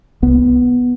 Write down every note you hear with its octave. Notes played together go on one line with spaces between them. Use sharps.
C2 B3